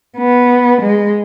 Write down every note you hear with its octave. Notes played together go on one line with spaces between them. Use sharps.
B3
G#3